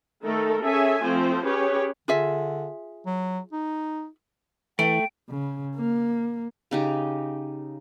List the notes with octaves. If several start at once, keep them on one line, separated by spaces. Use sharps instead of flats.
D#3 A3 A4 A#4
C#4 G#4 A4 E5 G#5
F3 A3 C4 C5
C#4 G4 G#4 B4 C#5
D3 F4 G#4 E5
F#3
D#4
E3 A3 G5 D7
C#3
A#3
C#3 D#4 G4